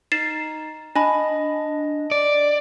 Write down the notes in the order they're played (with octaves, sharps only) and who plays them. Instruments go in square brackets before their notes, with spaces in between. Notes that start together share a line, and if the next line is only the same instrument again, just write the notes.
[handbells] D#4 [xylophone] A6 C7 E7
[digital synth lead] D4 [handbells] D#5 [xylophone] G#5 B5
[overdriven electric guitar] D5